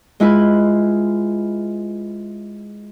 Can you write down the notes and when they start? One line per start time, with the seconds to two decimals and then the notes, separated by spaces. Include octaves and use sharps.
0.20 G#3 E4 F4 B4